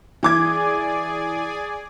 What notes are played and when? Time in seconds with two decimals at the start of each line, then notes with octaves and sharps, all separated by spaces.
0.23 E3 G#4 D5 G#5 D6 G#6